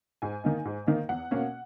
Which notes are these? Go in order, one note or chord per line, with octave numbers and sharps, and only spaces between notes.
G#2 G#5
D#3 A#3 D#4
G#2
D#3 A#3 D#4
E2 F#5
B2 A#3 C#4